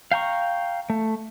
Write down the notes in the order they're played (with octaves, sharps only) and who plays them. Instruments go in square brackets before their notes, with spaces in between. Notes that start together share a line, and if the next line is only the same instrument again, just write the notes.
[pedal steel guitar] F5 G5 A#5 C#6
A3